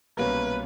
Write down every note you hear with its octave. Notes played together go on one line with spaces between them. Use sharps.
C2 B2 F#3 A#3 C#4 B4